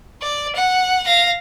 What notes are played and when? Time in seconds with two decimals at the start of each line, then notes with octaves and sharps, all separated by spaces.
0.22 D5
0.55 F#5
1.06 F5 A#6